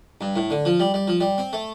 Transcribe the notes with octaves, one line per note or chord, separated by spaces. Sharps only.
G2
A2
D3
F3
G3
G3
F3
G3
C4
A3